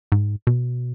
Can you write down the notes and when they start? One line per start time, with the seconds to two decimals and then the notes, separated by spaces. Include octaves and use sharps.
0.12 G#2
0.47 B2